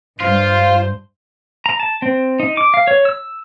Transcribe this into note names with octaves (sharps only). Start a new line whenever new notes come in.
G2 F4 C5
A#5
A5
C4
D#4
D6
F5
C#5
E6